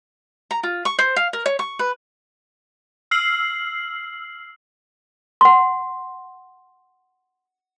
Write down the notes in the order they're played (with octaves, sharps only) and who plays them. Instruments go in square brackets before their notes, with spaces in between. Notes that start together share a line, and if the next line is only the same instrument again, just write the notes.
[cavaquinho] A#5
F4
C#6
C5
F5
A#4
C#5
C#6
B4
[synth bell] E6 F6 C7 F#7
[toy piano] F#5 C6